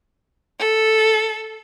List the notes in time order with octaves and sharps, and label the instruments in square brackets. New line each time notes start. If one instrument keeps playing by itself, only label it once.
[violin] A4